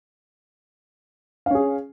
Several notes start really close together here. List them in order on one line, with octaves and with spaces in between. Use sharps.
F5 C#4 G#4